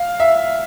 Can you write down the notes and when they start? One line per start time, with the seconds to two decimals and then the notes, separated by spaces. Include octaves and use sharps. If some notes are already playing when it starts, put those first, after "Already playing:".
Already playing: F5
0.20 E5